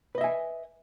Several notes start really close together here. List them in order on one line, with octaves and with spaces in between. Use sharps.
B4 D#5 E5 G#5